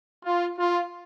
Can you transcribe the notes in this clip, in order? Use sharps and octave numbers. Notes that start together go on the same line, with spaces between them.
F4
F4